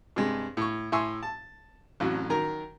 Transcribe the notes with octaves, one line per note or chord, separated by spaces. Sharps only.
G2 C3 G#3
A2 C#6
A2 E5 G#5 C6 C#6 E6
A5
A1 F2 A2 F#3
D#3 F#3 A#4 A#5